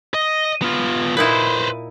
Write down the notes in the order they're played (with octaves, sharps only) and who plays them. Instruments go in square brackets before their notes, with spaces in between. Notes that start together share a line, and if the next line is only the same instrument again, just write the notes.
[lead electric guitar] D#5
B3 F4
[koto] A#2 D#4 E4 [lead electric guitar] B4 C5